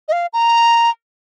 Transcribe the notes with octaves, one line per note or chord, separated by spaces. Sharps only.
D#5
F5
A#5